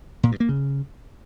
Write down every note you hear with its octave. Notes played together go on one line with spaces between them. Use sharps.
A#2
G2
A#3
C#3